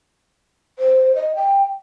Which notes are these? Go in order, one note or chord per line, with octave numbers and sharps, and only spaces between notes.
C5
D#5
G5